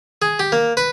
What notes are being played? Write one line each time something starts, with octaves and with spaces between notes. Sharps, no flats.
G#4
G4
A#3
B4